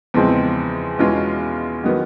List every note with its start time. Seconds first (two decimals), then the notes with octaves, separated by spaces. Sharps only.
0.14 E2 C#3 F3 G#3 C4
0.99 E2 B2 G#3 C#4 F4
1.84 D#3 F#3 B3